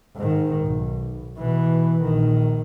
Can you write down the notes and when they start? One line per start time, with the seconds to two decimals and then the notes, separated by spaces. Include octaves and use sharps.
0.16 G#2 D#3
0.65 B1
1.37 B2 E3
2.03 A#1 D#3